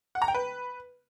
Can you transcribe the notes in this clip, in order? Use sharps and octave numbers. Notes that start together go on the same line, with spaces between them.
F#5
A#5
G5
B4